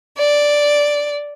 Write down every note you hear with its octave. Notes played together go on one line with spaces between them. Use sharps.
D5